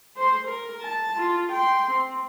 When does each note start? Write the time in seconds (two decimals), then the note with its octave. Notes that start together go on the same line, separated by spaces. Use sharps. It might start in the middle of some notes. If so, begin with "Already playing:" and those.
0.16 C5 C6
0.48 A#4
0.82 A5
1.15 F4
1.52 G5 C6
1.91 C4